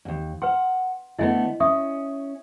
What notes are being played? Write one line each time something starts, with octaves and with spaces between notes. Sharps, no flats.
D#2 G#2
B4 F#5 C6
D3 A3 B3 E4 D#5 G#5
C#4 E5 C#6 D#6